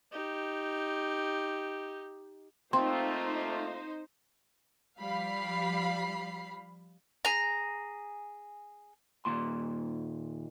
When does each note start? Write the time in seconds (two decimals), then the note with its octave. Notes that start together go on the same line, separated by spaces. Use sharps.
0.12 D#4 G4
2.73 A3 A#3 C4 D#4 F4 C5 C6
4.98 F3 G3 F5 B5 C7
7.25 G#4 A#5
9.25 D#2 A#2 C6